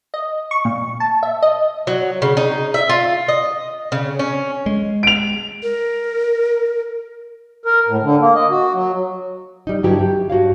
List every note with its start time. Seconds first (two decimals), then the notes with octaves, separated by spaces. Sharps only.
0.14 D#5
0.51 C#6
0.65 A#2
1.00 A5
1.23 E5
1.42 D#5
1.87 F#3
2.22 C#3
2.37 D#4
2.74 E5
2.89 F4
3.28 D#5
3.92 C#3
4.19 C#4
4.66 G#3
5.03 D7 F7
5.63 A#4
7.66 A#4
7.87 A2
8.02 D3
8.20 A#3
8.35 D#5
8.51 F#4
8.73 F#3
9.67 G3 D#4
9.83 G2 D3 F#3 E4 G4 B4
9.99 G4
10.30 G2 F#4 C#5 F5